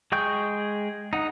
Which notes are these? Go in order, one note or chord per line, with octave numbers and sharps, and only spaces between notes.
G#3 G#4 G5 C#6 G6
D#4 F#5